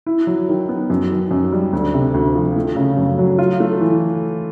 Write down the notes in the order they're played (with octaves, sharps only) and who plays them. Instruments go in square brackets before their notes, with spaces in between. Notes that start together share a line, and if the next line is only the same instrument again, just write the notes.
[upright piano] E4
F#3
D#3
B3
F#2
D#3
F#2
G3
D2
C3
D2
F3
A3
C#3
F#2
F#3
F4
A3
E3